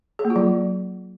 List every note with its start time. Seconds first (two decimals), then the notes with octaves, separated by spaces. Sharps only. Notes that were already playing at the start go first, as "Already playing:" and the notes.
0.19 G#4
0.25 A#3
0.30 F4
0.36 F#3